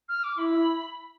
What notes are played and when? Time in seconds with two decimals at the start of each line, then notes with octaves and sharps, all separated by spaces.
0.08 F6
0.23 D6
0.38 E4 B5
0.53 E4